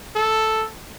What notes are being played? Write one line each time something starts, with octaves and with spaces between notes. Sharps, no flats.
A4